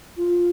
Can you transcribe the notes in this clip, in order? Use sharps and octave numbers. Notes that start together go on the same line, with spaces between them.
F4